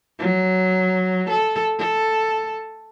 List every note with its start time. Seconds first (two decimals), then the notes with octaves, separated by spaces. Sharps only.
0.19 F#3
1.30 A4
1.79 A4